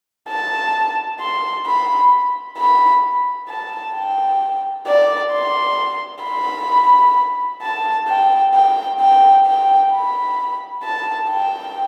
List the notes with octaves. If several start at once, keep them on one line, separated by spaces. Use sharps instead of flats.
A5
C6
B5
B5
A5
G5
D5
C6
B5
A5
G5
G5
G5
G5
B5
A5
G5